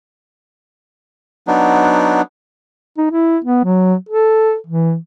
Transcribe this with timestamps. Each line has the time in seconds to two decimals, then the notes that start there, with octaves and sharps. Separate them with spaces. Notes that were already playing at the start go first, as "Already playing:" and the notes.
1.47 F#3 B3 D4 D#4
2.98 D#4
3.11 E4
3.45 B3
3.65 F#3
4.09 A4
4.67 E3